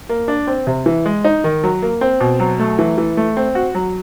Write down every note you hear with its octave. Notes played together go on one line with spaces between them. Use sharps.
A#3
D4
C4
C3
E3
G#3
D#4
D#3
F#3
A#3
C4
B2
F#3
A3
E3
E3
A3
C4
F#4
F#3